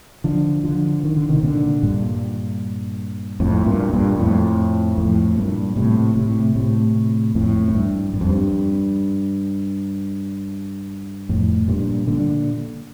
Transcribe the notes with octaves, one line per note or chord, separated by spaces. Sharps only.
D3 F3
D3 F3
D#3
D3
C3 D#3
A#2 D3
G2 A#2
F2 A2
G2 A#2
G2 A#2
F2 A2
F2 A2
G2 A#2
A2 C3
A2 C3
A2 C3
F2 A2
F2
G2
G2
F2
G2
F2 A2
G2 A#2
A#2 D3